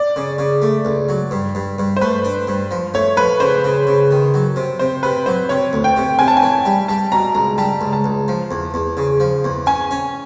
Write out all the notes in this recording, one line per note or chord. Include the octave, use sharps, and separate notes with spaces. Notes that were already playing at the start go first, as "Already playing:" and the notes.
Already playing: D5
C#3
C#3
A3
C#2
F#3
G2
G2
G2
C5
A3 B4
D4
G2
F3
A3 C#5
F3 B4
C#3 C5
C#3
C#3
D#3
F#3
C3
C3 C5
C3 B4
F#3 C5
C3 C#5
D2
G5
C3
C3 G#5
A5
G#5
E3
G3
G3 A5
B2 A#5
C#2 A#5
G3 A5
C#2
A5
C#2
F3
E2
E2
C#3
F3
E2
C#4 G#5
C#4